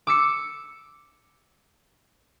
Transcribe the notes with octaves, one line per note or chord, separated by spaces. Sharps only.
D6 E6 C#7